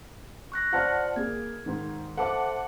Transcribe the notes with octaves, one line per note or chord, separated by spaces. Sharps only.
C#6 F#6 A#6
F4 C5 D5 F#5 A5 F6
A#3 G#4 G#6
G#2 D#3
A4 C5 E5 F#5 A5 D6